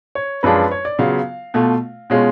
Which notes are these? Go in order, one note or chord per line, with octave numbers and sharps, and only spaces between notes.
C#5
F#2 F3 G#3 D4 F4 B4
B4
C#5
D5
C#3 F#3 B3 F4 F5
B2 A3 F4
B2 G#3 C#4 F4